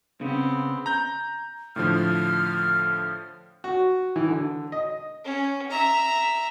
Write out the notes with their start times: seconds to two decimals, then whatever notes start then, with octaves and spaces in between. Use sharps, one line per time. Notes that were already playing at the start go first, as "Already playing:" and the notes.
0.21 C#3 B3 C4
0.86 A#5 G6
1.76 A2 D3 F3 F6
3.64 F#4
4.16 E3
4.28 D3
4.72 D#5
5.25 C#4
5.70 E5 A#5